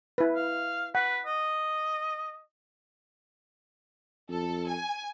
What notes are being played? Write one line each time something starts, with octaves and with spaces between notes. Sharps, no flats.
E4 B4
F5
B4 F#5
D#5
F2 A4
G#5